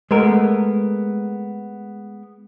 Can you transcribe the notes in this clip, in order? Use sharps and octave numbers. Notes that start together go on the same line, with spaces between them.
G#3 A3 B3 A#4